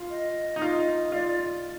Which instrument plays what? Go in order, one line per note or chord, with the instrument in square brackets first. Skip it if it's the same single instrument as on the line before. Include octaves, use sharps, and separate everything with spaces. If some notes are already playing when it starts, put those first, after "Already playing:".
Already playing: [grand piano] F4
[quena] D#5
[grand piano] D#4
F4
[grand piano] F4 [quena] D5